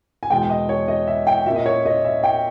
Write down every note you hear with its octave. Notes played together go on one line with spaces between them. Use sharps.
G#5
E2 B2 G#3 G5
D#5
C#5
D#5
E5
G5
A#2 A#3 C#4 E5
D#5
C#5
D#5
E5
G5